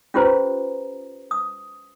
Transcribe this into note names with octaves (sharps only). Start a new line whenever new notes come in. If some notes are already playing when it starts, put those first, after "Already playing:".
C#4 F4 G4 B4 C5 A#5
D#6